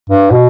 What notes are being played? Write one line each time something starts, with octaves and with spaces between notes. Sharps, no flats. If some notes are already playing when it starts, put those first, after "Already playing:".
G2
B2